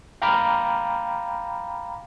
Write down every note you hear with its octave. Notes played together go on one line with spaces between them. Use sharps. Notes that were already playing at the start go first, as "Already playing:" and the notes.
F5 G5 A#5 B5 D6 F6